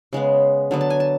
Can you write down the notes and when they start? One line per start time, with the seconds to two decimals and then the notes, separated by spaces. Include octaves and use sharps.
0.13 C#3 G#3 B3
0.71 D3 F#3 B3
0.81 A5
0.90 G#5
1.00 A5